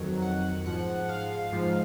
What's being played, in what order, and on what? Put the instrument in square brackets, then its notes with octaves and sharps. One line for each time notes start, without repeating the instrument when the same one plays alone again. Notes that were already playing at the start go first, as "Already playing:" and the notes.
Already playing: [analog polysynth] F2 D#3 F#3
F#5
G#2 F3 F#5
F5
G#2 F3